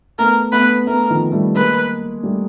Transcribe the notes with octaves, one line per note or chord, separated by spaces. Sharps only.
A3 B3 A#4
A3 B3 B4
A3 B3 A#4
D#3 F3
G3 A3
G#3 A#3 B4
G3 A3